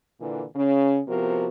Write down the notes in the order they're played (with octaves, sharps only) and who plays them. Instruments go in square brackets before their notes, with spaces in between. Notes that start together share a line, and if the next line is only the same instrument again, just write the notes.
[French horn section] A#2 D3 E3
C#3 C#4
C3 F3 B3 F#4 A#4